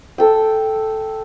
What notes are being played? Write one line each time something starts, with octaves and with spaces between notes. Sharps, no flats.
A4 G5